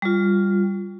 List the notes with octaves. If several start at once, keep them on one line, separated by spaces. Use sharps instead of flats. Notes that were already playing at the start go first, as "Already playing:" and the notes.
G3 F4